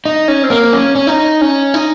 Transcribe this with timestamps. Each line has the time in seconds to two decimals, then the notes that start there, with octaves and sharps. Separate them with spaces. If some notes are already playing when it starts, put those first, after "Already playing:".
0.05 D#4
0.28 C#4
0.43 C4
0.50 A#3
0.73 C#4
0.95 C#4
1.07 D#4
1.41 C#4
1.74 D#4